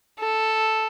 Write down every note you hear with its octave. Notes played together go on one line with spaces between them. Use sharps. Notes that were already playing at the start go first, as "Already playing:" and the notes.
A4